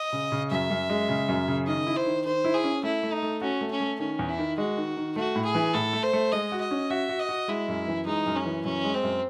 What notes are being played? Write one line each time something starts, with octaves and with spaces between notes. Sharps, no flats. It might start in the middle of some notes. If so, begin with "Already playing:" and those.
Already playing: D#5
C#3
C#3
F#2 E5
F#2
G#3
C#3
F#2
C#3
D#3 D#5
E4
C5
D#3
D#3 C5
E4
G#4
C#4
A3 E4
A3
D#4
A3
C#4 F#4
A3
C#4
A3
D#3 C#4
E2
E4
D#3
G#3 F#4
D#3
D#3
A3 F#4
A2
G#4
E3
A2 A4
A3
C5
A3
G#3 D#5
F#4
D#5
C#4
F#4 E5
F#4
D#5
F#4
G#3 E4
F#2
E3
G#3 D#4
F#2
C#4
E3
F#2 C#4
G#3
C4
F#2